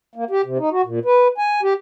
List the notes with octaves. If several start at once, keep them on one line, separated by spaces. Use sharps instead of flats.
A#3
G4
C3
D#4
F#4
A#2
B4
G#5
G4